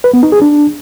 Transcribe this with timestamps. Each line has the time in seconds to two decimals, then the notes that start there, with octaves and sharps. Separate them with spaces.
0.04 B4
0.14 B3
0.23 D#4
0.32 G#4
0.42 D4